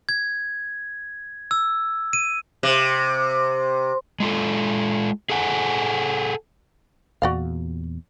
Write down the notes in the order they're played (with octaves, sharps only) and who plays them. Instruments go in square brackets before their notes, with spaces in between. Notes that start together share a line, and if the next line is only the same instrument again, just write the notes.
[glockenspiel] G#6
E6
D#7
[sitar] C3
[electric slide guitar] G#3 F4 A4
G#4 A4 F#5 G#5
[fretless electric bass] E2 A#2 [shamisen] F#4 D5 F5